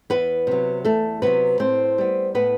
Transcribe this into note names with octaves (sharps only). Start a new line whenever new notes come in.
E2 B3 B4
C3 F#3
E2 A3 A4
C3 F#3 B3 B4
A2 C4 C5
G3 B3
A2 B3 B4